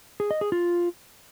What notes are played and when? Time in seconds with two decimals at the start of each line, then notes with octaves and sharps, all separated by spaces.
0.20 G#4
0.31 D#5
0.41 G#4
0.52 F4